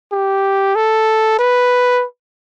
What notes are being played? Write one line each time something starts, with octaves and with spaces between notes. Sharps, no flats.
G4
A4
B4